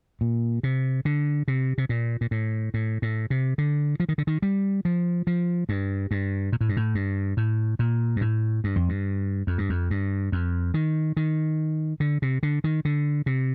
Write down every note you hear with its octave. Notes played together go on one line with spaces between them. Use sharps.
A#2
C3
D3
C3
C3
A#2
A#2
A2
A2
A2
C3
D3
F3
D#3
D3
D#3
G3
F3
F3
G2
G2
A#2
A2
G2
A2
G2
A2
A#2
G2
A2
G2
F2
G2
F2
G2
F2
G2
F2
D#3
D#3
D3
C3
D3
D#3
D3
C3